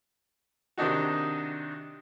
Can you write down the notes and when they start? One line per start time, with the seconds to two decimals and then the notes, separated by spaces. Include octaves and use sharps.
0.78 C3 D#3 D4 D#4 F#4